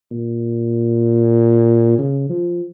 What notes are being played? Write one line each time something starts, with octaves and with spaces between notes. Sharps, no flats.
A#2
C#3
F3